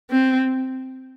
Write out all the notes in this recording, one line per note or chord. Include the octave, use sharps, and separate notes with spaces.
C4